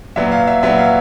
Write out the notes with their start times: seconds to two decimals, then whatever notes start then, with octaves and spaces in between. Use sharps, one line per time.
0.16 A#2 F#3 B3 E5
0.32 F5
0.47 E5
0.63 A#2 F#3 B3 E5
0.78 F5